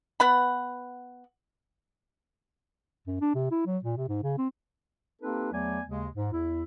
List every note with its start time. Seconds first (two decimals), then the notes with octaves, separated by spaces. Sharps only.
0.20 B3 F#5 B5
3.07 F#2
3.21 D4
3.34 C3
3.51 E4
3.66 F#3
3.84 A#2
3.97 C3
4.08 G#2
4.23 C#3
4.38 C4
5.22 A#3 C4 D#4 G4 A4 B4
5.52 E2 F#3 A3 B3 D5 G#5
5.87 D#2 C#3 G#3
6.16 G#2
6.33 E2 E4